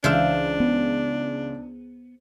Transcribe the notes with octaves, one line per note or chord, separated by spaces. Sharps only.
C#2 E3 D4 C5 E5 F5 E7
B3